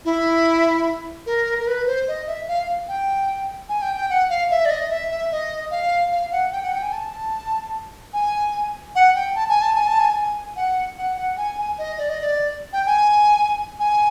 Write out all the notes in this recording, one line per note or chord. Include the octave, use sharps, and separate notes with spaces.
E4
A#4
A#4
B4
C5
D#5
E5
F5
G5
G#5
G5
G5
F#5
F5
E5
D5
D#5
E5
E5
D#5
F5
F5
F#5
G5
F#5
G5
G#5
A5
G#5
F#5
G5
A5
G#5
A5
G#5
A5
G#5
G#5
F#5
F#5
F#5
G#5
G#5
D#5
D5
D#5
D5
G5
G#5
G#5